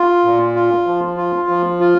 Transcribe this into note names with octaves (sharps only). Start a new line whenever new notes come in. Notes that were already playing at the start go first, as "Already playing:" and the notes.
Already playing: F4
A#2
F4
F3
F4
F3
F4